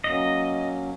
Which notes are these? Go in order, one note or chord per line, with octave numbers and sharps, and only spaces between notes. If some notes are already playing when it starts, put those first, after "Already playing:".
F#3 A#3 C#4 D#5